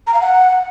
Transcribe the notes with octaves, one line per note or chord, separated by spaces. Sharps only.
A#5
F5
F#5